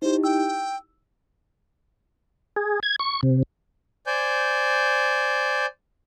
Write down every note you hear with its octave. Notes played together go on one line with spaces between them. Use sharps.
D#4 E4 G4 C5
G5 E6
G#4
G#6
C#6
C3
C5 D5 G#5 G6